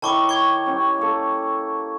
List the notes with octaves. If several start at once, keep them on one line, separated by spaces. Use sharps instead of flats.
D#3 E4 C#5 A5 C#6 D6
C#6 G#6
C#4 G4
A#3 A4